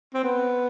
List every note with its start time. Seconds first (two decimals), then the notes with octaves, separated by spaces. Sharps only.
0.14 C4
0.24 B3